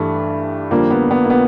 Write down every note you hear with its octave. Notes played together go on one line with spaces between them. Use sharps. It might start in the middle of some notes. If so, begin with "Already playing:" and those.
Already playing: G2 E3 G3 A3
F2 D3 G3 A#3
B3
B3
A#3
B3